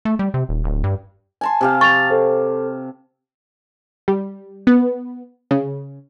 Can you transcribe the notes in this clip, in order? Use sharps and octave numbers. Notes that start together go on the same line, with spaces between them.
A3
G3
C3
D#1
D1
G2
G#5 A5 C6
C3 G4 F5
C#6 A6 F7
A4 C5
G3
B3
C#3